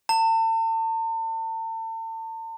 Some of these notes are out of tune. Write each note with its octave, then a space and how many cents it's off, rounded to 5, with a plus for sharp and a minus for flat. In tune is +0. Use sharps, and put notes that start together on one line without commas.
A5 +40